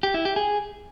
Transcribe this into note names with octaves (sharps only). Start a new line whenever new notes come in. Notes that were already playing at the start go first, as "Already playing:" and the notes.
G4
E4
G4
G#4